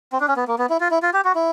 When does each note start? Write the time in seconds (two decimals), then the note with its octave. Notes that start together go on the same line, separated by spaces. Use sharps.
0.12 C4
0.20 D4
0.28 C#4
0.37 B3
0.48 A#3
0.58 B3
0.70 E4
0.81 F4
0.91 E4
1.03 F4
1.13 G4
1.25 F#4
1.35 E4